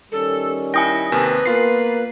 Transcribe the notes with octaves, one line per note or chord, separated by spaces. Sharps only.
D#3 G3 C#4 A4
E4 G5 G#5 D#6 A#6
D#2 C3 A#4 B4
A#3 B3 F4 C7